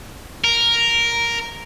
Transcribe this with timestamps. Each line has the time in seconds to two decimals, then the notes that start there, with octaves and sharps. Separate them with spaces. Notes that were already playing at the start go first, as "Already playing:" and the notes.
0.44 A#4